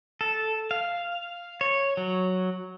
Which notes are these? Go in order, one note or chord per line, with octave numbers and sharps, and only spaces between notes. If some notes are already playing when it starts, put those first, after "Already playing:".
A4
F5
C#5
F#3